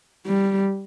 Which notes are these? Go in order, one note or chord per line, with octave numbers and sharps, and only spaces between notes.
G3